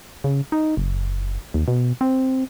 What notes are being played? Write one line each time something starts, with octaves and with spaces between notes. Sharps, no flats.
C#3
D#4
F#1
D#2
B2
C4